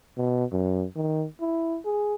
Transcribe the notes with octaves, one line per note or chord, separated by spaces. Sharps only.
B2
F#2
D#3
E4
G#4